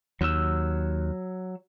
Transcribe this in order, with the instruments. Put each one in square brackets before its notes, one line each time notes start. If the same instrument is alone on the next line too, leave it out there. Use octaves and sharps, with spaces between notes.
[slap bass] D#2 [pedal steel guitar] F#3 E6